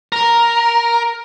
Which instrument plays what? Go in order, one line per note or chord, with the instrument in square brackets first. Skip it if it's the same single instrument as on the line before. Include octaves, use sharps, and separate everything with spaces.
[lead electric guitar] A#4